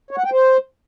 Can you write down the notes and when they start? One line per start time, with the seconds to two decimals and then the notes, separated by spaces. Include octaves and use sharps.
0.11 C#5
0.18 F#5
0.25 G5
0.32 C5